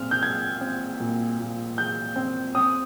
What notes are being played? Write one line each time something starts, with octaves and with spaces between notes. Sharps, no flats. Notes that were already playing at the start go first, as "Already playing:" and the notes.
Already playing: A#2 C4 F6
G6
G#3 G#6
C4
A#2
A#2
G#3 G6
C4
C4 D#6